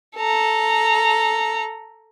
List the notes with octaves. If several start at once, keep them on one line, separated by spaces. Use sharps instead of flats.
A4 A#5